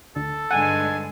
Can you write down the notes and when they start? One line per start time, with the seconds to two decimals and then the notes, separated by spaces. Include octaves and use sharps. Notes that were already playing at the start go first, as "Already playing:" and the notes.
0.16 D2 A4
0.51 G2 D3 G#3 D#4 F#5 G#5